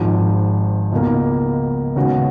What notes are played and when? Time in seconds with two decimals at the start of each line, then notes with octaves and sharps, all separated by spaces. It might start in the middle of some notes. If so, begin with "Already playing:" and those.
Already playing: G#1 G#2 F3
0.92 C#2 B2 A#3
1.96 D#2 C#3 G#3 B3 F#4